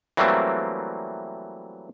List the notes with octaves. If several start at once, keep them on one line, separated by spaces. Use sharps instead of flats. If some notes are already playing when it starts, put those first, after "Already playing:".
E3 F#3 G3 A3 A#3 C4